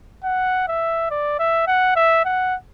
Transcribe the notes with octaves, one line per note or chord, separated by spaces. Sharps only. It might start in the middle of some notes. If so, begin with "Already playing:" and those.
F#5
E5
D5
E5
F#5
E5
F#5